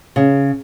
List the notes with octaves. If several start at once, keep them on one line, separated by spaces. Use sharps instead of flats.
C#3